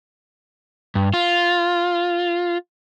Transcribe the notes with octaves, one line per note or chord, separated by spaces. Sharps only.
G2
F4